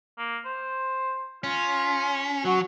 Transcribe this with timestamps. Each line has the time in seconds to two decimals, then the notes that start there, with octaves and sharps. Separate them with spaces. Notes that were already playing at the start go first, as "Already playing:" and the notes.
0.18 A#3
0.45 C5
1.44 C#4 F4
2.45 F#3 F#4